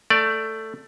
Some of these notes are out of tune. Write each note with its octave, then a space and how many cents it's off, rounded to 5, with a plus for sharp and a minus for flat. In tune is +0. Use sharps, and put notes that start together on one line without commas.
A3 +10 D5 +0